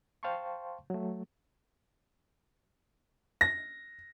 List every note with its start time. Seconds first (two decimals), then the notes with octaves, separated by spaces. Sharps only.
0.23 C5 F5 G5 A5 C6 C#6
0.90 F#3 A3
3.41 A#6